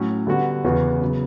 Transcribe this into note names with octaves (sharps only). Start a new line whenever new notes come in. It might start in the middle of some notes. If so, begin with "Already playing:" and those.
Already playing: A2 F#3 C#4
D3 G3 B3 F#4
E2 C#3 E3 B3 F#4
C#3 F#3 B3